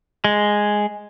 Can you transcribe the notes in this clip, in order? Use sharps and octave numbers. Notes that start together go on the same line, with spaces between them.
G#3